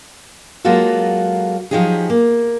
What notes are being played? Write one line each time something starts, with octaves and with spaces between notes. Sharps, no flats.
F#3 G#3 A#3 F4 F#4 A4
F3 F#3 D#4 G4 G#4
A#3